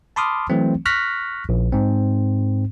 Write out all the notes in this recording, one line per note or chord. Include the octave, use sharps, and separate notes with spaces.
A5 B5 C6 D6 D#6 F6
E3 F#3 A3 C4
C#6 F6 F#6 A#6 B6
A#1
G#2 C4